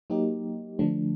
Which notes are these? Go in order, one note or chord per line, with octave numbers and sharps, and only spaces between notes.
F#3 A#3 D#4 G4
D3 F3 A3 D4